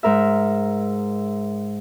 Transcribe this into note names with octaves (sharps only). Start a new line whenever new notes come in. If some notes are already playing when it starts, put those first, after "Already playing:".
G#2 A#4 E5